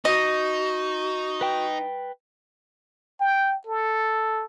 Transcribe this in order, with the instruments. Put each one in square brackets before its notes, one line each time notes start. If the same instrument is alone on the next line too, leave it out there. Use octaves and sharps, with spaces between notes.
[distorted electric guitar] D#4 [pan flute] F#4 [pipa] D#5
[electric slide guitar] B4 G5
[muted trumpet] G5
A4